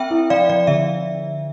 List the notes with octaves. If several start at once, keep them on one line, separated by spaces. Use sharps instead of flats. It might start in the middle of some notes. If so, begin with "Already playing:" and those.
Already playing: C4 E5 G5
E4
F3 D5 F5
F3 D5
D3 E5